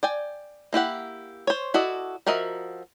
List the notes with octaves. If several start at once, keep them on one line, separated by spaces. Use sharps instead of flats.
D5 G5 G#5
A#3 E4 G4 F#5
C5 C#5
E4 F#4 A4 D5 D#5
F3 F#4 A#4 D#5 E5